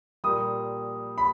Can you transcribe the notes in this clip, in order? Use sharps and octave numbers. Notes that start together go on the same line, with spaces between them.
A#2 G3 A#3 D#6
B5